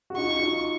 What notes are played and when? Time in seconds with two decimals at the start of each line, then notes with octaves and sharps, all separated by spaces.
0.10 F#4
0.16 D#4 F4 C#6
0.35 F#4
0.42 D#4 F4